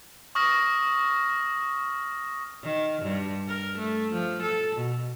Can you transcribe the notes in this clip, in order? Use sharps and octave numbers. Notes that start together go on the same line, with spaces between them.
C#6 D#6 F6 A#6
D#3
G2
A#4
A3
F3
A4
B2